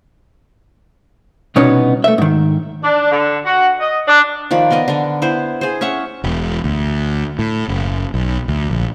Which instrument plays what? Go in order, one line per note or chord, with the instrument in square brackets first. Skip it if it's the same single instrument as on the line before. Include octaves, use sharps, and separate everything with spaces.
[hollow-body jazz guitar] C2 B2 B3 C#4 D#4 C#5
A3 E5
G#2 D#3
[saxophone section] D4
D3
F#4
D#5
D4
[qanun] D#3 F3 D5 B5
B3 A#4 D5 D#5
D3 D4
B3 E4 C5
G#4 C5
C#4 C#5 E5 F#5
[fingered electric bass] E1
D2
A2
F#1
B1
D2
A#1